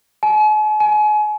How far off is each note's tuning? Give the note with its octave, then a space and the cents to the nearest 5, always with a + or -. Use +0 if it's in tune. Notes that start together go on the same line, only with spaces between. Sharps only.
G#5 +45
G#5 +35